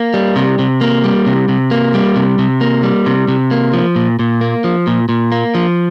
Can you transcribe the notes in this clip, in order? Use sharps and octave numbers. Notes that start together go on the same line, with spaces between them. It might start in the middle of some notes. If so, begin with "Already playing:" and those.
Already playing: A#3
G3
C3
C3
A#3
G3
C3
C3
A#3
G3
C3
C3
A#3
G3
C3
C3
A#3
F3
A#2
A#2
A#3
F3
A#2
A#2
A#3
F3